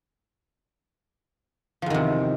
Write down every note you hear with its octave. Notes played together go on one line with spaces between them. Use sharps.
E2 C3 D#3 F3